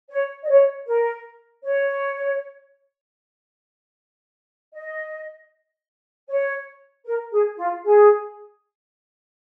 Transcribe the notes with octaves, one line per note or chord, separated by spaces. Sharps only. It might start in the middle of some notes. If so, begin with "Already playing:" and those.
C#5
D#5
C#5
A#4
C#5
D#5
C#5
A#4
G#4
F4
G#4